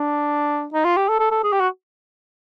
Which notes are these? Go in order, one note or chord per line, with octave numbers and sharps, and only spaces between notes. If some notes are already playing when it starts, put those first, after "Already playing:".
Already playing: D4
D#4
F4
G4
A4
A4
A4
G#4
G4
F#4